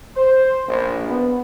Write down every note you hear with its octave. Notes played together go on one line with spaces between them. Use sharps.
C5
A#1
B3